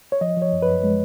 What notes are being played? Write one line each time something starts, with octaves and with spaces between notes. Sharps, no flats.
C#5
F3 D#5
F3
C#5
F#2
B4
F#2
G#3